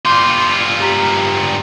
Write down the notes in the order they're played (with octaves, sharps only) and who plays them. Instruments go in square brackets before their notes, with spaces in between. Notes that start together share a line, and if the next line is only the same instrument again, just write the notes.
[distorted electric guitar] G2 F4 [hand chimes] C6 D6 G6
[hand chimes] G4 A#5 B6